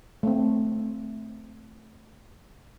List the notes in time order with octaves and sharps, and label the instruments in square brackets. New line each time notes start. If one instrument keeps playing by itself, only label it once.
[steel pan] A3 C4